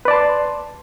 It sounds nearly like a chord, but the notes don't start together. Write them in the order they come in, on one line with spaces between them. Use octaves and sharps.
B4 D5 A5 C6